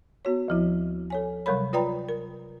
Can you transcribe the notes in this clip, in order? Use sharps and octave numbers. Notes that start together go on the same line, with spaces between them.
B3 F#4 C#5
D2 F3 E4
A4 C#5 G#5
C3 F#3 G3 A#4 C#5 B5
F4 B4 D5 G5 A#5 B5
A#4